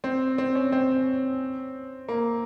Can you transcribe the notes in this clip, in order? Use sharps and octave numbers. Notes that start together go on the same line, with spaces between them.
C4
C4
C#4
C4
A#3